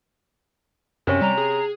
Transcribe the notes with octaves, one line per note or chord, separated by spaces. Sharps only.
F#2 C3 C#4
G3 A#5
G#4